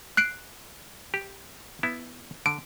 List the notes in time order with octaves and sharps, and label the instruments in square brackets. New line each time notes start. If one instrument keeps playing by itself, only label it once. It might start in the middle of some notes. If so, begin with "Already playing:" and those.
[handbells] F#6 C7 D7
[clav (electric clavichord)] G4
B3 E4
[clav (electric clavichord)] D3 [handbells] D7